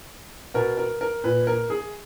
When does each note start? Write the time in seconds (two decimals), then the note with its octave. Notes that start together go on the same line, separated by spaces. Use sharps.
0.54 B2 A#4
0.77 A#4
1.01 A#4
1.24 A#2 B4
1.47 A#4
1.70 G#4